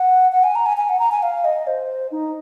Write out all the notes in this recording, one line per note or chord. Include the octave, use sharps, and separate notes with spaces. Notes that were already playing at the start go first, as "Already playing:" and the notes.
Already playing: F#5
F#5
G#5
A#5
G#5
G#5
F#5
A#5
G#5
F5
D#5
C5
D#4